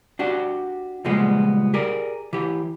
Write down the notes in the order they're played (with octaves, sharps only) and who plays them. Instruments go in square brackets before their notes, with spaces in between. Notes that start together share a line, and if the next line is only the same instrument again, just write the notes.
[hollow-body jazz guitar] D4 F#4 G4
C#2 A#2 F3 G3 G#3 B3
G4 G#4 A#4 D5
E3 G4